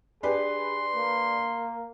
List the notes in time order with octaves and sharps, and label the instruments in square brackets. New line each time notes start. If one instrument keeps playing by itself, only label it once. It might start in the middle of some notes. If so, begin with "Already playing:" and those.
[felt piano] D4 G4 B4 [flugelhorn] G#4 [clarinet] C6
[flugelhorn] A#3